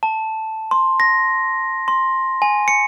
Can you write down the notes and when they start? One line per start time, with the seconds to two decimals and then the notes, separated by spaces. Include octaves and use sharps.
0.03 A5
0.71 C6
1.00 A#6
1.88 C6
2.42 G#5
2.68 C#7